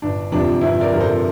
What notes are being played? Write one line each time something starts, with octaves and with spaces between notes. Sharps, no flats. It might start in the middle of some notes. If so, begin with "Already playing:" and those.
G1 D4
F2 C3 F3 D4
G1 C4 E4
A#4 D5
F2 C3 F3 A#4
A4 C5